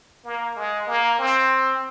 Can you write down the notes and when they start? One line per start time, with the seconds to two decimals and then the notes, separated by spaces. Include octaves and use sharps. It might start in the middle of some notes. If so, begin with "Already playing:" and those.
0.25 A#3
0.56 G#3
0.87 A#3
1.18 C4